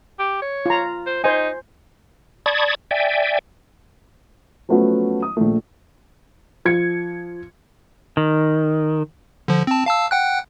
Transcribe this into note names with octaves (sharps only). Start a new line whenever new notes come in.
G4
C#5
F4 A#5
C5
D#4 C5 G#5
D5 A5 B5 C#6 D#6 G#6
D5 E5 G5 G#5
F3 F#3 A3 B3 C#4 F#4
D#6
A#1 A3
F3 G#6 C#7
D#3
D3 F3
C4 A5
F5 A5 E6
F#5 G5 F#6